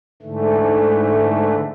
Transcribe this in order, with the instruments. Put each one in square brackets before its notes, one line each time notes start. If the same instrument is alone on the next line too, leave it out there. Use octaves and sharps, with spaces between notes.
[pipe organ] G#2 D3 E3 A3